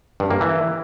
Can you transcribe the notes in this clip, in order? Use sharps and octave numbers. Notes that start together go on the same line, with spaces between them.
G2
A#3
E3